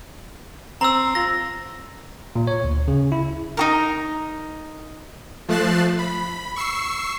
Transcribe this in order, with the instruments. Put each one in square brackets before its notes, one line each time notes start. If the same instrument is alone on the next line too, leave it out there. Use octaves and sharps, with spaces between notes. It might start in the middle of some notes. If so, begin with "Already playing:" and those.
[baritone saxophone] C4 [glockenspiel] A#5 E6
[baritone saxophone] F4 [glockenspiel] A#6
[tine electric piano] A#2
C#5
D2
C#3
E4
[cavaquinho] D#4 F#4 A#4
[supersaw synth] F3 A3 F#6 A6 C7 E7
B5
C#6 E6 C7